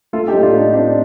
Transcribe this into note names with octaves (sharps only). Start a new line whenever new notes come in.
A3 F4 A4
D#4 G4
A2
D4 F4
A3 D#4
C4 D4 F4